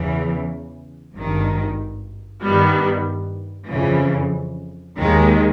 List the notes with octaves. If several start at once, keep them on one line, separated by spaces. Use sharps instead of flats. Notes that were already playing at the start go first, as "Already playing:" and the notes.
Already playing: E2 C#3 E3
G#1 G2 D#3
G2 D#3 G3 B3
F2 C#3 E3
D#2 D#3 G#3